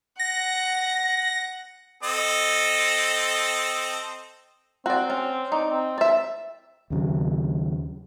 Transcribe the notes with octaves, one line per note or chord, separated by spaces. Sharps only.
F#5 A#6
C4 A4 D#5
C4 F#4 D5
C#4
D#4 D5
C4
D5 E5
D#2 C#3 F#3